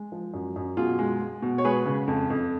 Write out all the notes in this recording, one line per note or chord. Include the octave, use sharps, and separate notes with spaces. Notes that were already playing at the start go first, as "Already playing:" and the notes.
Already playing: G#3
F3
F#2
F#2
B2 F4 G#4
G#3
G#3
B2
C#5
G#3 G#4 B4
C#3
F2
F2